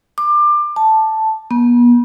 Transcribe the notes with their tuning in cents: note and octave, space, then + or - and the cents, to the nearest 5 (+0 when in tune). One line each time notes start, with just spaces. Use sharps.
D6 +25
A5 -5
B3 -40